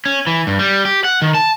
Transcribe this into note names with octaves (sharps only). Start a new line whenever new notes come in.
C#4
E3
G2
G3
G4
F#5
D#3
A5